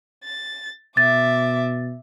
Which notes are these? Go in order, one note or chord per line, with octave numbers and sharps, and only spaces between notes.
A6
B2 E5 D6 A6